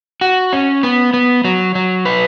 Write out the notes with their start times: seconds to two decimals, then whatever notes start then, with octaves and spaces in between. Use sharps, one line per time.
0.21 F#4
0.53 C#4
0.83 B3
1.14 B3
1.44 F#3
1.75 F#3
2.05 B4